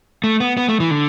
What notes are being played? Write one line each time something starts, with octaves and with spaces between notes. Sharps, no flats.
A3
B3
B3
A3
E3
D3